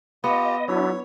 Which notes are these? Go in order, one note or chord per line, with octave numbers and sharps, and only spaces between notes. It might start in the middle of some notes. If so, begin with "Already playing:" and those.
B3 F4 G4 D#5
F#3 D4 E4 C#5